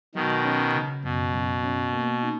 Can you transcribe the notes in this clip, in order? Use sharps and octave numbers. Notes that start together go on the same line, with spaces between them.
B2 D#3 F#3
C#4
C#3
F#2 B2
F#3
C#4
A#3
D#4